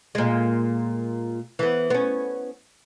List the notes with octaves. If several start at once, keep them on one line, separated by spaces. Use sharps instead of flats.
A#2 G#3
E3 B3
B3 C#4